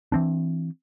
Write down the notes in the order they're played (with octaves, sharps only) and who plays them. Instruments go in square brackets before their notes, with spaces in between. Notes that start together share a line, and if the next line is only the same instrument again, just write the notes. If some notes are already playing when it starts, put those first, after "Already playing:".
[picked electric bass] E3 C4 D4